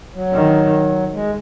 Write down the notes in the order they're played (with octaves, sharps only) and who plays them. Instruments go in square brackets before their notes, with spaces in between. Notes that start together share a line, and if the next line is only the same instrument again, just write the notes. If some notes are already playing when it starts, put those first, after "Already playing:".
[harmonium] F#3
[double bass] D#3
[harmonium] G#3